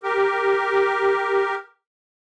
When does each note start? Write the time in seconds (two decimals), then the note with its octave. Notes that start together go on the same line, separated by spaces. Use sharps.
0.03 G4 A#4